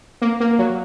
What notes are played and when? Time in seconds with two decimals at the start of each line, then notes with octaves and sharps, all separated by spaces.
0.22 A#3
0.40 A#3
0.59 F#3